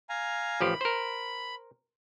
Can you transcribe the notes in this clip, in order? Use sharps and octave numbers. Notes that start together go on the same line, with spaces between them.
F5 G#5 A#5
A1 F3 G4 B5
A#4 C5